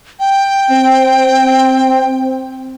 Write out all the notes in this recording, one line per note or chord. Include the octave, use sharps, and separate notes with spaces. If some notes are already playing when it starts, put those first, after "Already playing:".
G5
C4